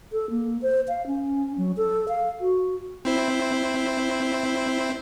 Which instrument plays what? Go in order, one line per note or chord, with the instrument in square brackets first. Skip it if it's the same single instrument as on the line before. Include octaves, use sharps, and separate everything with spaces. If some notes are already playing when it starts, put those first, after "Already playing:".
[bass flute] A4
A#3
C5
F5
C#4
F#3
A4
F5
F#4
[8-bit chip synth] C4 E4 C5